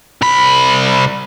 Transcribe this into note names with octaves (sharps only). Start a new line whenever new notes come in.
C2 B5